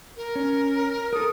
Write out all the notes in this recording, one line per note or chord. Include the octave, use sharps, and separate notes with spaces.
A#4
C#4
A4 A#4 D#6